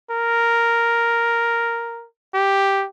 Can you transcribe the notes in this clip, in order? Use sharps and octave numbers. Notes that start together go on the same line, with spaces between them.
A#4
G4